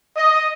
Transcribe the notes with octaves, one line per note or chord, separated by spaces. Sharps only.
D#5